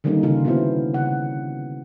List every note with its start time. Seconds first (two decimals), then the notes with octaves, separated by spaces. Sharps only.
0.04 D3 D#3 G3 A#3 C#4 D#4
0.23 C#3 F4 F5
0.45 B2 B3 E4 C5
0.94 C#3 F#5